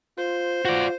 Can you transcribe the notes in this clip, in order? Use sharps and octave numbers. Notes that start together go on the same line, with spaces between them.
F4 C5
F4 F#4 D5